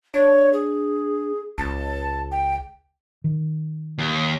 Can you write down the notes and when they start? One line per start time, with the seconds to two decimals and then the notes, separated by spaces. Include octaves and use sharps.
0.14 D4 C#5
0.53 G#4
1.58 C#2 A5
2.32 G5
3.24 D#3
3.98 D#2